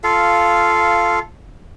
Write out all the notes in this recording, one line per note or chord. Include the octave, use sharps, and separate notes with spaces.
F4 A4 F5